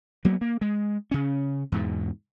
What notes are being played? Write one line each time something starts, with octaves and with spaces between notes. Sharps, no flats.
F#3 A#3 B3
A#3
G#3
C#3 C#4
E2 G#2 B2